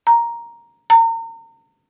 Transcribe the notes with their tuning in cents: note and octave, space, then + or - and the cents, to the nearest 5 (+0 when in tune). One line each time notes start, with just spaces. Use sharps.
A#5 +5
A#5 -35